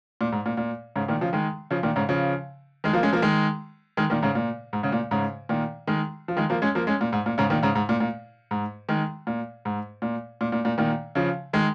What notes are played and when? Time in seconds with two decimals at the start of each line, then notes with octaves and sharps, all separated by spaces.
0.21 A#2
0.32 G#2
0.46 A#2
0.57 A#2
0.96 G#2 C#3
1.08 A#2 D#3
1.21 C#3 F3
1.33 D#3 G#3
1.71 C#3 F3
1.83 A#2 D#3
1.96 G#2 C#3
2.09 C#3 F3
2.84 D#3 G#3
2.93 F3 A#3
3.03 G#3 C#4
3.13 F3 A#3
3.22 D#3 G#3
3.97 D#3 G#3
4.10 A#2 D#3
4.22 G#2 C#3
4.35 A#2
4.73 G#2
4.83 G#2 C#3
4.92 A#2
5.11 G#2 C#3
5.49 A#2 D#3
5.87 D#3 G#3
6.28 F3
6.37 D#3 G#3
6.50 F3 A#3
6.62 G#3 C#4
6.75 F3 A#3
6.87 G#3 C#4
7.01 A#2
7.12 G#2
7.26 A#2
7.38 G#2 C#3
7.50 A#2 D#3
7.63 G#2 C#3
7.75 G#2
7.89 A#2
8.00 A#2
8.51 G#2
8.89 D#3 G#3
9.27 A#2
9.65 G#2
10.02 A#2
10.41 A#2
10.52 A#2
10.65 A#2
10.78 A#2 D#3
11.15 C#3 F3
11.53 D#3 G#3